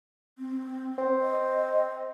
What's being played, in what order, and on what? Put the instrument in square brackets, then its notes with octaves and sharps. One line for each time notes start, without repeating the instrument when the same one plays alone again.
[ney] C4
[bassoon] C4
[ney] D#5